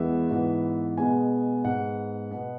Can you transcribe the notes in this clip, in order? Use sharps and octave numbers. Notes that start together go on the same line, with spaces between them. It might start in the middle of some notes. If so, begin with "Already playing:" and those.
Already playing: E2 E3 G#3 B3 E5
G#2 E3 B3
B2 G#3 B3 G#5
G#2 G#3 B3 F#5
B2 B3